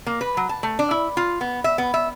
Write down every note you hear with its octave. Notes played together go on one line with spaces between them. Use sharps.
A#3
B4
F#3
A5
A3
D4
E4
F4
B3
E5
B3
E5